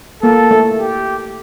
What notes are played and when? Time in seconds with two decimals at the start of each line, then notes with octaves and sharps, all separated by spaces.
0.22 A#3 A4
0.51 A3
0.78 G4